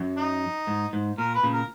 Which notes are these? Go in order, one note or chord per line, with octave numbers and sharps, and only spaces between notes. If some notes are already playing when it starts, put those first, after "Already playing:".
Already playing: F#2
D#4
G#2
G#2
A#2 A#4
B4
A#2 C#3
A#4